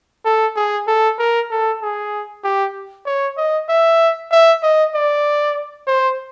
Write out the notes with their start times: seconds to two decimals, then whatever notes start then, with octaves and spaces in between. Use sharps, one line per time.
0.25 A4
0.56 G#4
0.88 A4
1.19 A#4
1.51 A4
1.82 G#4
2.44 G4
3.06 C#5
3.37 D#5
3.69 E5
4.32 E5
4.63 D#5
4.95 D5
5.87 C5